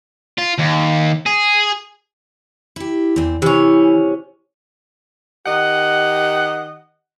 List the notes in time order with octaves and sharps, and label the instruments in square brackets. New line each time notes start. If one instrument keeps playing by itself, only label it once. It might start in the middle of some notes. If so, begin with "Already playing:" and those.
[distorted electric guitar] F4
D#2
G#4
[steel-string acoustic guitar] E4 G4
E2 C4
[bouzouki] C3 C#4 [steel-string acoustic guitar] E3
[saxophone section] D#3 G4 D#5 F#5